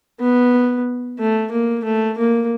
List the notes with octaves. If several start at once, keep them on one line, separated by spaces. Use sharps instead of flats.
B3
A3
A#3
A3
A#3